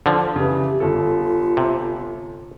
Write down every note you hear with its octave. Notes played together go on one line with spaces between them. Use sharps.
D3 F3
C#3 E3 G4
G1 F4 A4
C3